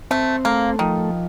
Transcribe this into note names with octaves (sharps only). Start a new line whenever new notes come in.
A3 C4
A3 A#3
D#3 F3